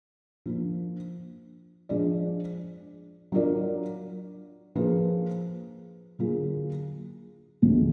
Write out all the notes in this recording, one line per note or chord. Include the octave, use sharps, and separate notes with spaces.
F3 A#3 D4
F3 G#3 D4 G#4 D5
F#3 D4 F4 A#4 D5
F3 A#3 F4 G#4 B4
D3 F#3 A#3 F4 G#4
D2 D3 F3 G#3